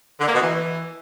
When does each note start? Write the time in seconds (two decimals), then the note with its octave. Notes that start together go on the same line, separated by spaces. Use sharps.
0.20 D3
0.27 A#3
0.34 B2
0.41 E3